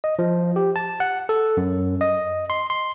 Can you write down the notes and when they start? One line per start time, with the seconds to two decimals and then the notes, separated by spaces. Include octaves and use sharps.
0.04 D#5
0.19 F3
0.56 G4
0.76 A5
1.00 F#5
1.29 A4
1.57 F#2
2.01 D#5
2.50 C6
2.70 C6